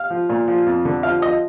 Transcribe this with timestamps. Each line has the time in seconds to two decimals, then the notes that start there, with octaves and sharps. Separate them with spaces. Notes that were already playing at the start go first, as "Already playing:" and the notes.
Already playing: F5
0.10 F3
0.29 A#2
0.48 F3
0.66 F2
0.85 D3
1.03 F3 F5
1.21 F3 D#5